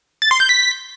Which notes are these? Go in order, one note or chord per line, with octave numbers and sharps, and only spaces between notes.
A6
C6
G6
B6